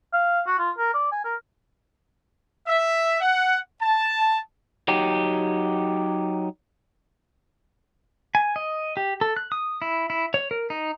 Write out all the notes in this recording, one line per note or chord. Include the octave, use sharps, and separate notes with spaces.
F5
F#4
F4
A#4
D5
G#5
A#4
E5
F#5
A5
F#3 D#4 G4
G#5
D#5
G4
A4
F#6
D#6
E4
E4
C#5
A#4
D#4